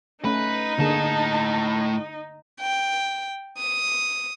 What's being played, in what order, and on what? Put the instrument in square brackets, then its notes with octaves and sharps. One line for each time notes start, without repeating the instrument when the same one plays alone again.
[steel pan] A3 C#4 [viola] D#4 [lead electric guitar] B4 B5
[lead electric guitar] A2 A5 [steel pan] D3 A#3 G#4
[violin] G5
D#6